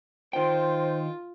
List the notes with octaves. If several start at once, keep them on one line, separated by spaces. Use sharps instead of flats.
D#3 F4 C5 G5